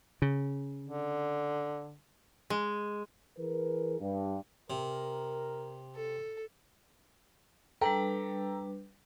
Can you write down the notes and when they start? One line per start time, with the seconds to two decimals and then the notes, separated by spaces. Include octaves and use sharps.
0.22 C#3
0.83 D3
2.50 G#3
3.38 E3 G#4 A#4 B4
4.01 G2
4.70 C3 A#4
5.95 A4
7.81 G3 D4 A4 B4 G5 A#5